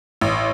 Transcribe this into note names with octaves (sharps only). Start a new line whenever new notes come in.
A1